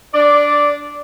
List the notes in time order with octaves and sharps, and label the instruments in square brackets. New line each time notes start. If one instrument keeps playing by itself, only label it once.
[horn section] D4 D5